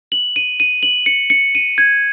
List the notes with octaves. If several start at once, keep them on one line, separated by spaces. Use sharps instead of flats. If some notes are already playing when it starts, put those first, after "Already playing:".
F#7
D#7
D#7
F#7
C#7
C#7
D#7
G#6